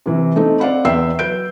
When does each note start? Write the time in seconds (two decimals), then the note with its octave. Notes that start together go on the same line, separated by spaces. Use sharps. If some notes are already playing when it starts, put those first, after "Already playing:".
0.06 C3 E3
0.36 A3 C4 D#4
0.60 C4 D5 F5 F#5 B5
0.85 E2 B4 E5 G5 E6 C7
1.19 F#3 B4 G6 D7